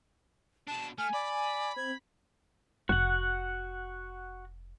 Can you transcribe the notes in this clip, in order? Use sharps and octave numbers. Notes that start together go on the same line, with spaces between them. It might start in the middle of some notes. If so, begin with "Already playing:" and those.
B2 D4 A5
A3 G#5 F6
D5 B5
C4 G#6
F1 F#4 F#5